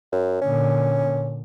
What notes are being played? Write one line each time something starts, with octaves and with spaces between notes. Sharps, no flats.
F#2
A#2 D3 C#4